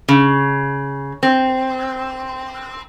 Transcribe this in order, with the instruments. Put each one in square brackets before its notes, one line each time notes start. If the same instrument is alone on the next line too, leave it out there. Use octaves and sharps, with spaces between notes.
[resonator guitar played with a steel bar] C#3
C4